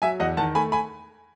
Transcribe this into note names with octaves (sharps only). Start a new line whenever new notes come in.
F#3 E5 G#5
E2 D#5 F#5
D#3 F#5 A5
A3 G#5 B5
G#5 B5